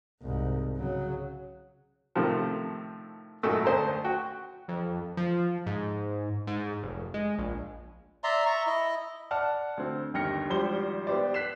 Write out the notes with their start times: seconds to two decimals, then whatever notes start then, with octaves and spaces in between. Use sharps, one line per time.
0.22 C2 G#2
0.77 C#3 F#3
2.16 A2 C3 D#3 F3
3.43 G#1 F#2 A#2 A3 E6
3.65 D2 C5 A5 A#5
4.04 F#4 G5
4.68 F2
5.17 F3
5.66 G#2
6.47 G#2
6.83 F1
7.14 G#3
7.38 A#1
8.24 D5 E5 A#5 C6
8.46 E5 A#5 C#6
8.67 E4 D#5
9.31 D5 F#5 A5 F6
9.77 D2 C4
10.14 G1 D#2 G5 F6 A#6 C#7
10.50 G#1 F3 G3 G4 C5 G7
11.07 B3 G4 C5 D5
11.34 F#6 B6 C7 E7